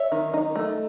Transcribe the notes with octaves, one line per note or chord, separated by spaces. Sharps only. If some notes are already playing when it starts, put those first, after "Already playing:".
Already playing: C#5 E5
D#3
D#4
A3